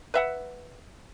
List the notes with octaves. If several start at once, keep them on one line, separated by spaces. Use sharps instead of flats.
B4 E5 F#5